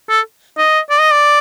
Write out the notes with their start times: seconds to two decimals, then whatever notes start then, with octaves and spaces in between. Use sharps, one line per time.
0.09 A4
0.58 D#5
0.90 D5
1.00 D#5
1.12 D5